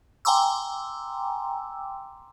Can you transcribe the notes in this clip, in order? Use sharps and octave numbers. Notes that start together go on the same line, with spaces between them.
G5 G#5 A#5 C6 D6 E6